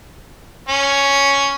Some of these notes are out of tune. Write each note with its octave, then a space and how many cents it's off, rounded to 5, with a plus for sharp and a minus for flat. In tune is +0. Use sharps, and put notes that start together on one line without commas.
C#4 +5